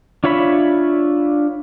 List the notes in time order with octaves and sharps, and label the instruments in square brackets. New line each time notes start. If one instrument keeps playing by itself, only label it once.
[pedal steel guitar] D4 F4 C#5 E5 B5